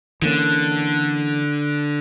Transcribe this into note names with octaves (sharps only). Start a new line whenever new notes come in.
D3 E3 A#3 C#4